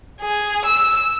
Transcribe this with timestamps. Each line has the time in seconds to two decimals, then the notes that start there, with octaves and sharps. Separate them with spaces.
0.21 G#4
0.65 E6